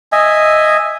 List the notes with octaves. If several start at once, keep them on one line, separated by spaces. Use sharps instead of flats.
D#5 E5 G#5